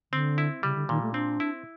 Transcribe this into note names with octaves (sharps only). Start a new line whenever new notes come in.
D3 C4
E4
C#3 G3
D3
A#2 D#3
A3
C4 D4
E4